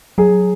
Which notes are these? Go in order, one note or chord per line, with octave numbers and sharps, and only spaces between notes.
F#3 G#4